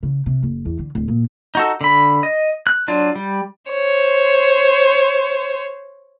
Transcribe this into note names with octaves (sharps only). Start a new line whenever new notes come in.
C#3
C3
F#1
E2
D3
D1
A#2
D#4 F#4 A4
D3 B5
D#5
F#6
F#3 D4 F4 D5
G3
C5 C#5